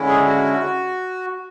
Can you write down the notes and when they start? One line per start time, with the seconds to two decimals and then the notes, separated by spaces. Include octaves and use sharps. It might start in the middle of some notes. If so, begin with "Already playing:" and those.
Already playing: D3 G#3 C#4 E4
0.08 G#4
0.27 F#4